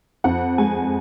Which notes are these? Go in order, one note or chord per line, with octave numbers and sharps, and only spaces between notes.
F2 F#5
G#3 G#5